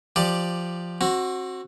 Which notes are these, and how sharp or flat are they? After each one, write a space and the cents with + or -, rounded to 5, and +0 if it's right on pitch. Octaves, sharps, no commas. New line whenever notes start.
F3 +0 G4 +0 D5 +10
C4 +30 F#4 +0